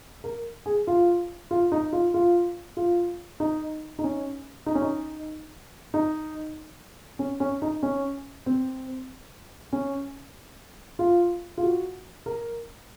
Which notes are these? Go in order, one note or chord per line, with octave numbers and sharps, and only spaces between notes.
A#4
G#4
F4
F4
D#4
F4
F4
F4
D#4
D#4
C#4
D#4
C#4
D#4
D#4
C#4
C#4
D#4
C#4
C4
C#4
F4
F4
F#4
A#4